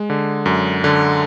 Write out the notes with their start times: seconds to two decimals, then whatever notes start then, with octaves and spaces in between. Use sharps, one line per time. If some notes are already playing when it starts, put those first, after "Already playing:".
Already playing: G#3
0.10 D3
0.46 F#2
0.84 D3